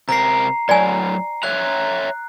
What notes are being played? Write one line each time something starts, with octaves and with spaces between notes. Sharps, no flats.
C3 A#4 A#5 C7
A2 F#3 D5 G#5
C#5 E5 A#5 F#6